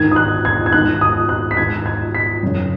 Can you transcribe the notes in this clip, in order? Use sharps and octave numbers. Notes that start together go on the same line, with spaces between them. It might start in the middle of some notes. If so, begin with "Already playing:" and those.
Already playing: G#2 D#3 G#6
D#6
F#6
G#6
G#6
G#2 D#3 F#6
D#6
F#6
B6
G#2 D#3 G#6
G#6
B6
F#2 C#3